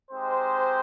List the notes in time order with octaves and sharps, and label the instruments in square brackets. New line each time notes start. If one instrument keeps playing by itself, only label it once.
[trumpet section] G#3 C4 D#4 G4 C5